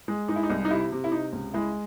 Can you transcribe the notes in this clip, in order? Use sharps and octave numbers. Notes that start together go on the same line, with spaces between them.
G#3
G#3 D#4
E4
D#4
C2
D#4
C3 E4
C3
E4
C3 D#4
C#2
G#3 E4